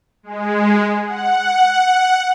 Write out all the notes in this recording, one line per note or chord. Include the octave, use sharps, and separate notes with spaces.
G#3
F#5